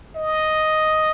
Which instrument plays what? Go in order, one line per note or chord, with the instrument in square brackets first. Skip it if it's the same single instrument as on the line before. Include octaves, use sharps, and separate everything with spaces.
[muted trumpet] D#5